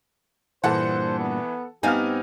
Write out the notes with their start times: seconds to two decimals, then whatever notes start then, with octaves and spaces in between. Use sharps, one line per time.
0.64 G2 A#2 E3 A4 C5 F#5
1.20 B3
1.83 G2 B3 C4 D#4 G4 F5 G#5 F6